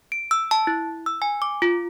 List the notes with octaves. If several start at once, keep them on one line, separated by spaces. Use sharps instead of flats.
D7
E6
A5
E4
E6
G#5
D6
F4